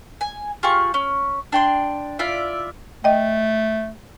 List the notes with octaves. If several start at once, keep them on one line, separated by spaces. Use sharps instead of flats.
G#5
F4 G4 G#4 C#6
C#4
D4 G5 C6
E4 F4 D5 E5
A3 D#5 G5